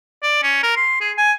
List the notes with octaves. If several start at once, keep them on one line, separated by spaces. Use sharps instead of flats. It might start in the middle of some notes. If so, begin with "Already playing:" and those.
D5
C#4
A#4
C6
G#4
G#5